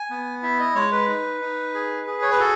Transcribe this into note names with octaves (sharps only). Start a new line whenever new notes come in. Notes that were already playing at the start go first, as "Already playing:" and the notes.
Already playing: G#5
B3
E4 E5
D#5
G#3 C#5
B4
D#4
D#4
G#4
G#4
C#5
B4
F#4 A4